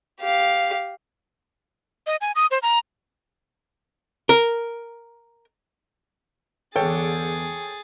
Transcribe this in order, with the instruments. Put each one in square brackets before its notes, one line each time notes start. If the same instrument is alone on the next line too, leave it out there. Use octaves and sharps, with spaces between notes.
[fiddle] G4 F5
[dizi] D#5
G#5
D#6
C5
A#5
[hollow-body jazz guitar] A#4
[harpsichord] E2 D3 [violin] G#4 A6 [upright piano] A4 C#5 G5